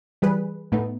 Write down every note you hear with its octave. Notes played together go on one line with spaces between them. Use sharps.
E3 G3 G#4 B4
A2 A3 B3 D#4